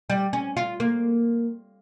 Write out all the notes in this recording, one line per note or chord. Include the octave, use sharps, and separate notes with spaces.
G3
C#4
F4
A#3